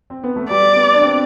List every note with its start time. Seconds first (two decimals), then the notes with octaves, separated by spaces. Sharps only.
0.10 C4
0.24 B3
0.36 A3
0.50 G3 D5
0.76 B3
0.95 D4
1.02 C4